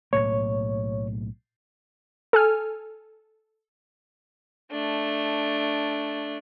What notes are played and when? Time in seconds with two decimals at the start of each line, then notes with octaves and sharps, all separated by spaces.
0.13 B1 A2 A#3 C#5
2.33 A4 G#5 F6
4.71 A3 D4